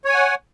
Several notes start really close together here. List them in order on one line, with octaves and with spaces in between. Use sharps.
C#5 G#5 F#5